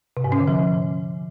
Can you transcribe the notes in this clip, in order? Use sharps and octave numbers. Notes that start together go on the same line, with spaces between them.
C3
G#2
C#4
D3
F3